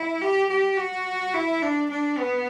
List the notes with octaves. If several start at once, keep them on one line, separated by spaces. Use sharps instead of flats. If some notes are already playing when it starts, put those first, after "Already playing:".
Already playing: E4
G4
G4
F#4
E4
D4
D4
B3